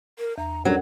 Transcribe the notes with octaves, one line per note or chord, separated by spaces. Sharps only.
A#4
E2 A#5
G2 F#3 C#4 A4 A#4 D5